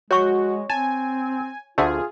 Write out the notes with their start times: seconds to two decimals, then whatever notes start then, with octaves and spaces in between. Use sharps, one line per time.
0.11 G#3 F#4 C#5 C#6
0.70 C4 G#5 A5
1.78 D2 D3 A3 F4 G#4